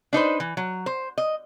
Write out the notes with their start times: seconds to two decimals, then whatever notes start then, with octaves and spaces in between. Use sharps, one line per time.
0.13 D4 D#4 B4 C5
0.40 E3
0.57 F#3
0.86 C5
1.18 D#5